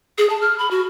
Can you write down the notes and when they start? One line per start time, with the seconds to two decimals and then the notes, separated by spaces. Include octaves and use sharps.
0.18 G#4
0.30 A5
0.41 F6
0.58 B5
0.71 F#4